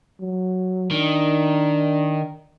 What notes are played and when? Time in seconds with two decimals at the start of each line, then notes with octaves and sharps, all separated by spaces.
0.21 F#3
0.91 D#3 D4